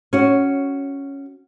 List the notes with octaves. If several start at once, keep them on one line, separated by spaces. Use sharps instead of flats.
C#4 F#4